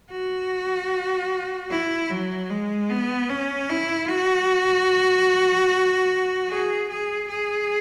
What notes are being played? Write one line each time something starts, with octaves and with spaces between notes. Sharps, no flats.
F#4
E4
F#3
G#3
B3
C#4
E4
F#4
G#4
G#4
G#4